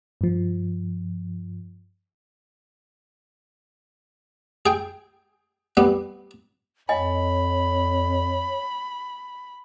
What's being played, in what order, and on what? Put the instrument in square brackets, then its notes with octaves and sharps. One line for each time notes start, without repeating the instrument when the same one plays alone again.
[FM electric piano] G2 F3
[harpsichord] G#4 G5
G3 B3
[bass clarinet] F2 [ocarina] C#5 [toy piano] D#5 G#5 [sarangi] B5